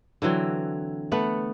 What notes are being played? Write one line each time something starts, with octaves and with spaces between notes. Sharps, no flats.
D3 E3 F#3 C4
A3 B3 F#5